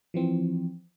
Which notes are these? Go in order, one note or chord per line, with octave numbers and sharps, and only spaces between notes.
E3 F3 C4